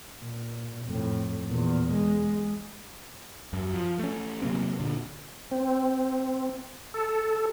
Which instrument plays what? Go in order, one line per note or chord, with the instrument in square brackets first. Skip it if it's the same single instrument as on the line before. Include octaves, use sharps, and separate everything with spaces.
[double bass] A#2
F2 A2
E2 A#2
G#3
[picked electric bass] F#2
F3
A3 C#4
C3 F#3 A#3 C4
A#2 D3
[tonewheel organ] C4
A4